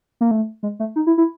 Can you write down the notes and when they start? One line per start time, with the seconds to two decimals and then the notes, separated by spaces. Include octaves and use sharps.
0.21 A#3
0.31 A3
0.63 G#3
0.80 A3
0.96 D#4
1.07 E4
1.18 E4